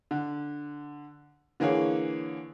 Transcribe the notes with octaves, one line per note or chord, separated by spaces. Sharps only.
D3
D3 E3 A#3 G#4 C#5